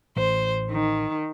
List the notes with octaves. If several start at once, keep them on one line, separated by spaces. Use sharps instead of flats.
A1 C5
D#3